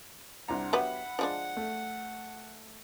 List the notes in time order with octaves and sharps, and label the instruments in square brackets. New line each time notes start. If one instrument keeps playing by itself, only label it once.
[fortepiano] C2 D4 A#5 [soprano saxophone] F#5
[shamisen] F#3 B3 G4 [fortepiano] E5 B5
[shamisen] F3 G#3 D4
[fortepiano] A3